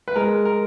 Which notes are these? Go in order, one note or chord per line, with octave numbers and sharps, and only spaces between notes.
B4
G#3 A#4
A#4